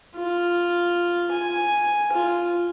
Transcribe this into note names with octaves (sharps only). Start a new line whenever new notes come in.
F4
G#5
F4